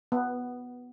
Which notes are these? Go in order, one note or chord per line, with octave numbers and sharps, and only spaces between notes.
B3